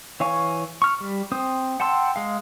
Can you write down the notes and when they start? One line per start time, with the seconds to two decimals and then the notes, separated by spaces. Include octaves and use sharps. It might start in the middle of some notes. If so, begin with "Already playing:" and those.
0.20 E3 C#5 F5 G#5 C#6
0.82 C#6 F6
1.00 G3
1.32 C4 C5 D#6
1.80 F#5 G5 A5 C6 E6
2.16 G#3 F5